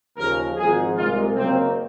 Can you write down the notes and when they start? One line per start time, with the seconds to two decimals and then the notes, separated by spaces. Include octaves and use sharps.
0.17 D#2 C#3 F3 A#4
0.56 G#1 G#2 F3 G#4
0.96 C2 A#2 G#3 F4
1.36 F#1 F#2 D#3 A#3 C4